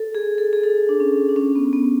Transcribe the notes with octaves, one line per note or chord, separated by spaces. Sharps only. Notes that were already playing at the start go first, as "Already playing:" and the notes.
Already playing: A4
G#4
A4
G#4
A4
D4
C#4
D4
C#4
B3
B3